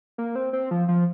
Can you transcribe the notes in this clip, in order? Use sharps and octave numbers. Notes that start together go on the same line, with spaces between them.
A#3
C4
C4
F3
F3